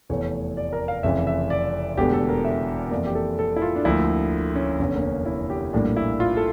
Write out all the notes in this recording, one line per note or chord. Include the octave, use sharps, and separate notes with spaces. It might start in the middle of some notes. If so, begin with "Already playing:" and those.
F1 E2 E3 A3 C#5
D5
A#4
F5
F1 F2 C#3 E3 E5
E5
D5
E1 E2 D3 A3 G4
A4
A#4
E5
F2 E3 A#3 D5
G4
A4
A4
E4
F4
D4
D2 D3 F3 A#3 E4
C#4
F1 E2 D3 C#4
A#3
C#4
E4
G4
A#1 A2 G3 A#3 D4
E4
F4
A4